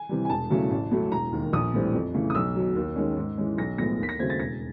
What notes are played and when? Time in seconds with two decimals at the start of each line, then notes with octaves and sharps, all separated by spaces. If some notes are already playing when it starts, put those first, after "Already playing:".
Already playing: G#5
0.09 C3 E3 G3
0.25 G#5
0.29 E1 A5
0.50 E2 C#3 F#3 A3
0.70 A1
0.91 A2 F#3 A3
1.11 E1 A#5
1.32 D#2 D#3
1.53 A#1 D#6
1.74 A2 E3 G3 C4
1.94 F2
2.14 C#3 E3 A3
2.30 D#6
2.35 B1 E6
2.56 B2 F#3
2.76 D#2
2.96 D#3 G#3 C#4
3.17 G#2
3.37 E3 G#3 C#4
3.58 B1 A#6
3.78 A2 F3 G#3 B3 A#6
3.99 D#2 B6
4.09 A#6
4.19 C#3 F#3 A3 C4 G#6
4.30 A6
4.39 E1 A#6